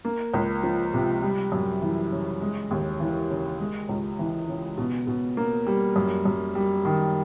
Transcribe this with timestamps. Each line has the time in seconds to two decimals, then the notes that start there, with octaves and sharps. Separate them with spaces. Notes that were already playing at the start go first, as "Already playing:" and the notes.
0.05 A#3
0.34 C#2
0.63 F3
0.94 C3
1.22 G3
1.52 F#2
1.82 E3
2.12 C#3
2.41 G#3
2.71 D#2
3.00 E3
3.30 C#3
3.59 G#3
3.89 C#2
4.19 E3
4.48 C#3
4.78 B2
5.07 B2
5.37 A#3
5.66 G3
5.96 F#2
6.25 F#2
6.55 G3
6.85 D#3